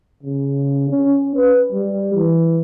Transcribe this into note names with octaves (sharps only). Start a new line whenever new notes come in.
C#3
C#4
B4
G3
E3